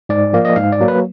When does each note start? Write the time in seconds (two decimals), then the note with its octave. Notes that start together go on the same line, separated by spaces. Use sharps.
0.09 G#2 D5
0.33 F3 A#3
0.45 D#5
0.56 G#2 F5
0.72 D5
0.80 F#3 A#3
0.88 B4